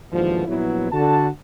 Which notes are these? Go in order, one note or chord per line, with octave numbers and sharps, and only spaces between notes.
D#2 G#2 B2 D3 E3 F3
A#1 F#3 B3 E4
D3 F#4 A5